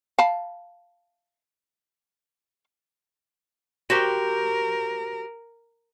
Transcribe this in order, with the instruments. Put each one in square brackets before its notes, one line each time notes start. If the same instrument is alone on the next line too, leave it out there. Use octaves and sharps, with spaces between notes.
[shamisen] F5 A5 B5
[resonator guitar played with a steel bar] F#4 G4 C5 [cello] A#4